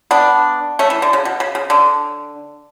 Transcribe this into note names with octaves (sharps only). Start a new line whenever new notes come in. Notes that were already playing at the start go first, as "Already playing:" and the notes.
B3 D4
A3 C#4
E3
D3
C#3
B2
C#3
C#3
D3